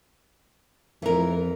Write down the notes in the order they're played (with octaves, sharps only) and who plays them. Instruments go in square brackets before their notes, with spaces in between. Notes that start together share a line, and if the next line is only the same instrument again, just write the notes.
[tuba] F2 [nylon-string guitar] E3 A#4